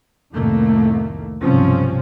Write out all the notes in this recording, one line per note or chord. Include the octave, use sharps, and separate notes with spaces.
C2 F2 A2 D#3 A3 A#3
B1 G2 C3 F3 C4 C#4